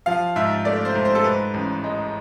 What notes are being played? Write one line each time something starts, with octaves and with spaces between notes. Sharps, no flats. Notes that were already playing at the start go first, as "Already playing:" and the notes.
F3 F5
G#2 E5
A3 D5
C5
G#2
C5
A4
G#2 B4
A1
G#3